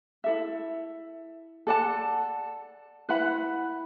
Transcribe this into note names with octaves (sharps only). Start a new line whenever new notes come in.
E4 A4 E5
A4 D5 F#5 A5
E4 B4 F#5 B5